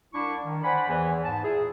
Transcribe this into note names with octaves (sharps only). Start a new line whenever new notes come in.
C2 D4 E4 C#6
D#3
C5 D5 F#5 G#5 B5
E2 E3
G#2 B3 A5
A#2 E4 G#4